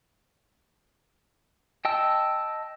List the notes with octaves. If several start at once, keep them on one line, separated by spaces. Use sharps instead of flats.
D#5 G5 A5 E6